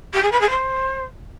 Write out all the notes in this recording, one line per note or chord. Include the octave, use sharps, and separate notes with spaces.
G4
G#4
B4
G#4
C5